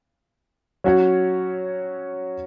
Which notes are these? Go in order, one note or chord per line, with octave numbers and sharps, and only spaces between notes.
F#3 C#4 F#4 C#5